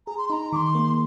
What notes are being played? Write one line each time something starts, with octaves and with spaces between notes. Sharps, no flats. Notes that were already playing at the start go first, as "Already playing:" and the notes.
G#4 A#5
C6
D#4 A#5 C6
D#3 C6 D6
A#3